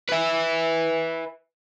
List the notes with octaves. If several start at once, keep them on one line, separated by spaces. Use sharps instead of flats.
B4 E5